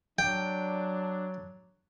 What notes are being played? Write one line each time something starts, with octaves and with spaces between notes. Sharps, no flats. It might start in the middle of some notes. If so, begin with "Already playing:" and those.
F#3 D4 G5